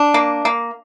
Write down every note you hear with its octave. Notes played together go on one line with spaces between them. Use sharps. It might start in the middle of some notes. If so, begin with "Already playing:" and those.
Already playing: D4
A#3
A#3